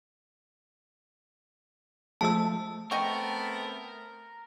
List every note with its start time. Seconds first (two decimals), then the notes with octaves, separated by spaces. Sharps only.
2.21 F3 G#3 A3 A5 E6
2.91 A3 B3 C4 A#4 D#5 G5 C#6